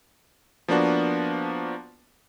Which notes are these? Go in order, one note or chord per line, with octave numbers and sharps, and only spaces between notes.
F3 A#3 B3 D4 F#4